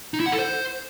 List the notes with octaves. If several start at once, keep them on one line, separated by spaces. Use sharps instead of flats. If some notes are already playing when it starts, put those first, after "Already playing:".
D#4
E4
F#5
A4
C5